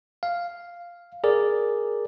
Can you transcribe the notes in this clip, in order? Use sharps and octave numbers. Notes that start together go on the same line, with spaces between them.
F5
G#4 A#4 D5